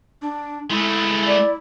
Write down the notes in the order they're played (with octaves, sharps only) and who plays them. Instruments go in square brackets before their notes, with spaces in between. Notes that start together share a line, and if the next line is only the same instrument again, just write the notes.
[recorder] D4
[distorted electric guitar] G#3 A3 [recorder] E4
[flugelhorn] D5